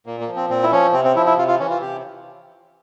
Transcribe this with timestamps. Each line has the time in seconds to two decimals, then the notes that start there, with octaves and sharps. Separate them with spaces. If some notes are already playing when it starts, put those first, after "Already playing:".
0.06 A#2 A#3
0.21 A#3
0.28 F3
0.36 C4
0.49 A#2 C4
0.63 E4
0.72 F3 C#4
0.93 C3 C4
1.05 C4
1.16 F3 E4
1.26 E4
1.37 C3 F4
1.48 F4
1.59 E3 C#4
1.70 F4
1.81 C3 G4